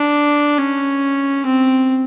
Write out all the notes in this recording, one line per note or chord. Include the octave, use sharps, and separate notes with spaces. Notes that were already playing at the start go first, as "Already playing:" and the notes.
Already playing: D4
C#4
C4